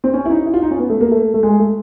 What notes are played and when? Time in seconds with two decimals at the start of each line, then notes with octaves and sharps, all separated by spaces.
0.04 C4
0.14 C#4
0.25 E4
0.30 D#4
0.46 E4
0.54 F4
0.62 D#4
0.71 C#4
0.79 B3
0.90 A3
1.01 A#3
1.11 A3
1.34 A3
1.43 G#3
1.60 A3